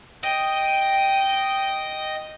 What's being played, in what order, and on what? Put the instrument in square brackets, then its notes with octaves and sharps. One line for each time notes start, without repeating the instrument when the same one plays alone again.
[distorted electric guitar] D#5 [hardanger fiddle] G5